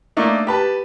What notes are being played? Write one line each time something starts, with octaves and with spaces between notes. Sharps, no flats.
A3 A#3 D4 D#4
G4 B4 A5